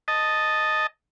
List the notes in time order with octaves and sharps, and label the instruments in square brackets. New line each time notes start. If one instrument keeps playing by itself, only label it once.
[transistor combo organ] D#5 A5